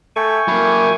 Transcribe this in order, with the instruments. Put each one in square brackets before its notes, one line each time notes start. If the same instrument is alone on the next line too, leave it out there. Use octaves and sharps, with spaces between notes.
[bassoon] A3 [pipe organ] G5 G#5 C#6
[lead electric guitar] F#3 A#3 [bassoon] E4